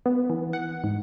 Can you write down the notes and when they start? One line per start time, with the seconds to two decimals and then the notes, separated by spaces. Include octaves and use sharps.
0.06 B3
0.30 E3
0.53 F#5
0.84 G#2